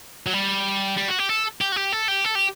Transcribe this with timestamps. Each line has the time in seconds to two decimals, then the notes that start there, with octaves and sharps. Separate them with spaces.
0.27 F#3
0.33 G3
0.97 G3
1.08 F#4
1.19 G4
1.29 A4
1.61 G4
1.72 F#4
1.76 G4
1.92 A4
2.08 G4
2.25 A4
2.35 G4